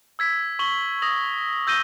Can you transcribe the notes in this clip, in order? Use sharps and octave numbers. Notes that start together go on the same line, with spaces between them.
E6 G#6 B6
C#6 F#7 G7
D#6 A#6 F#7
E6 G6 A#6 D#7 G7